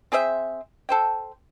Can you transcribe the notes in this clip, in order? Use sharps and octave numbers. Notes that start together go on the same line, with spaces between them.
C4 G#4 C5 E5
A4 C5 G5